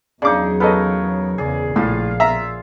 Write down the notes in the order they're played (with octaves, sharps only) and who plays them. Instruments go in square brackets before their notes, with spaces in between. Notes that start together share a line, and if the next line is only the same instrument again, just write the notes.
[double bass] E2 F#3 [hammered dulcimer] C#3 D#4 [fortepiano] D4 D6
[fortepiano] B3 A4 D#5 [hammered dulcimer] A#4 C#5
[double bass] E2 C#3 [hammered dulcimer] G#4 D5
[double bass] A#1 [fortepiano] A2 [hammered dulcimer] F4 F5
[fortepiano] E5 A#5